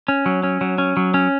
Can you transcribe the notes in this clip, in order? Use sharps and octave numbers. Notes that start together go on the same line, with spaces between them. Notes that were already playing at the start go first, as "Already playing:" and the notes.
C#4
F#3
C#4
F#3
C#4
F#3
C#4